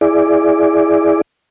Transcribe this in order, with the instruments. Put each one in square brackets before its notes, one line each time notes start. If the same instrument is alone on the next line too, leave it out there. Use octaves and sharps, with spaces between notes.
[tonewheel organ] E4 G#4 D5